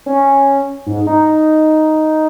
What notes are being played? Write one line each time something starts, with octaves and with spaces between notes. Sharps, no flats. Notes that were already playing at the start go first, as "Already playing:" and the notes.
C#4
G#2
D#4